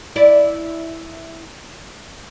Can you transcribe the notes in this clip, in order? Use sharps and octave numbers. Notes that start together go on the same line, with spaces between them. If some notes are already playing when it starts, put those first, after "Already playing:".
E4 D5